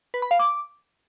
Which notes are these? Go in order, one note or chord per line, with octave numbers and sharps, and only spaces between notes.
B4
B5
F5
D6